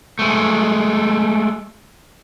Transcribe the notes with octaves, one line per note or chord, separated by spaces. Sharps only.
G#3 A3